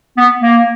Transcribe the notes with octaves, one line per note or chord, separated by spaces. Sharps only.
B3
A#3